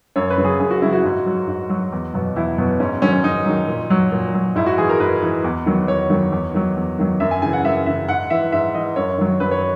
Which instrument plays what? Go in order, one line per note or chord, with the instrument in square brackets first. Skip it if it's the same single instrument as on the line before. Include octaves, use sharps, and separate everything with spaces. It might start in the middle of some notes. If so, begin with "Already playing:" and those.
[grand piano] F#2 C#5
B4
C#3 F#3
G#4
F#2 G#4
F#4
C#3 F#3 E4
F#4
G#2
F#3
G#2
F#3
E2
B2 F#3
E2 E4
B2 F#3
G#2 C#4
D#3 F#3 C#4
C#4
G#2 D#4
D#3 F#3
A#2
F#3
A#2
F#3
G#2 E4
F#4
E3 G#4
A#4
G#2 B4
E3
E2
D#3 F#3
E2 C#5
D#3 F#3
E2
D#3 F#3
E2
D#3 F#3
F#2 E5
G#5
C#3 E3 G#5
F#5
F#2 E5
C#3 E3 E5
G#2 F#5
E3 E5
G#2 E5
E3 D#5
F#2 C#5
D#3 F#3
F#2 B4
C#5